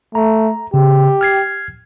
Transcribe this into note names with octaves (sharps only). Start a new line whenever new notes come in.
A3 A#5
C#3 G4
F6 G#6 C7